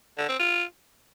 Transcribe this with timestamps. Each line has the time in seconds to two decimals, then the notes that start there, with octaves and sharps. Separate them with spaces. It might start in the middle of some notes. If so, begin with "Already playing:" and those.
0.18 D3
0.29 C4
0.40 F4